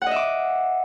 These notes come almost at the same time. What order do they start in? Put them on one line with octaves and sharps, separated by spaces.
F#5 D#5 E5 D6